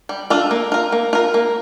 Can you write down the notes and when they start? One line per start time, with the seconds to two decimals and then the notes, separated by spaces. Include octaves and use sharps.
0.09 G3
0.30 D4 F4 A4
0.51 A#3
0.72 F4 A#4
0.92 A#3
1.13 F4 A#4
1.34 A#3